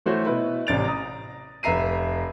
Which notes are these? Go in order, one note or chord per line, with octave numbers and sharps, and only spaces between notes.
E3 A3 F#4 C5 C#5
B2 E4 B4
A1 C3 D5 A6 D7 F7
A#5 D#6
F1 B4 E5 A#5 C7 D#7